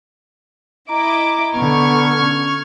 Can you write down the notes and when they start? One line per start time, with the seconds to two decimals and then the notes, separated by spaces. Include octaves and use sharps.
0.89 E4 D#5 A#5 D6
1.55 D3 B3 C#6 F6 G#6
2.19 C#4